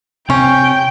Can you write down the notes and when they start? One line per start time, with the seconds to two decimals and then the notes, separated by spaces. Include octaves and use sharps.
0.30 C3 C#4 G5